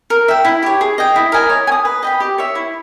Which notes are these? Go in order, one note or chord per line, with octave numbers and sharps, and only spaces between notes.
A#4
E5 G5
E4
G4 C#5
G#4
D#5 G5
E4
A#4 D#5 G#5
C#5
G#5
D#6
B4
D#5 G5 B5
G4
C#5 E5
E4